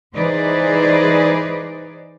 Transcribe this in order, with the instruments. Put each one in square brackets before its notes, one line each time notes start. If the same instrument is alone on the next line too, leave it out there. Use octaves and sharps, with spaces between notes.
[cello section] E3 D#4 G#4 B4 C5 D5